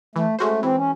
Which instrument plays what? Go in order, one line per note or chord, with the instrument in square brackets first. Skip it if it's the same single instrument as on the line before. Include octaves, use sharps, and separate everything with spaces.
[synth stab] E3 [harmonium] A3
[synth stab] G#3 C#4 F#4 C5 [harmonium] A3
[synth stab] E3 [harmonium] C4
[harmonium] C#4